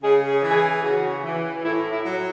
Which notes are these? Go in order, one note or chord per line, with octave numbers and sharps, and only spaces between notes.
C#3 G#4
G#4
E3
G#4
C#3 F#4
E3
A2 E4
E4
F#3